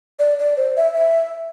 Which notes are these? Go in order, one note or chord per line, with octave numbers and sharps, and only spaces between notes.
D5
D5
C5
E5
E5